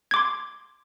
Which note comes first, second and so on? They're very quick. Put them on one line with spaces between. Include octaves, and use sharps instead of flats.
G#6 D6 C6